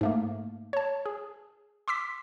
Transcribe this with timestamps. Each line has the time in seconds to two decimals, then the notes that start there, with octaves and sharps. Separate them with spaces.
0.01 G#2 A3 A#3
0.73 C#5 A5
1.06 G#4
1.88 C6 D6 E6 B6